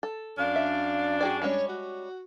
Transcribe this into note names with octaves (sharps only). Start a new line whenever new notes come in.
A4
F#2 D4 F5
E5
F#4 G#4 D5 G5
G3 G#3 C#4 C#5
F#4